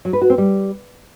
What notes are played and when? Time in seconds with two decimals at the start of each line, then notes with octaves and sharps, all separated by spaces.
0.05 F#3
0.13 B4
0.21 F#4
0.30 C4
0.38 G3